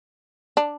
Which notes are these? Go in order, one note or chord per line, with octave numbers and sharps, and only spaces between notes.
D4